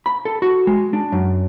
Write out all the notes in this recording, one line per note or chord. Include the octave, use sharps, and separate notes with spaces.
B5
A4
F#4
G#3
D4
F#2